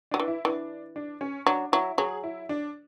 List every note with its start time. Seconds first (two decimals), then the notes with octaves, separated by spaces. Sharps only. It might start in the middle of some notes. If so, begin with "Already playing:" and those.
0.11 F#3 D4
0.20 E3
0.28 E4
0.45 E3 D4
0.96 D4
1.21 C#4
1.47 F#3 D4
1.72 F#3 E4
1.98 F#3 G#4
2.23 E4
2.49 D4